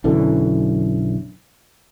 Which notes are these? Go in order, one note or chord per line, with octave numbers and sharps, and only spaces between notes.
B1 F#2 D3 E3